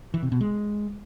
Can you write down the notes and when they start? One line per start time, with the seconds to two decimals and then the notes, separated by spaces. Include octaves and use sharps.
0.14 E3
0.23 C3
0.32 B2
0.41 G#3